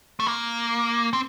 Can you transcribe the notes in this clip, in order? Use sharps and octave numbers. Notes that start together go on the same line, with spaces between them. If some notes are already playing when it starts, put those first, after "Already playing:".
A3
A#3
C4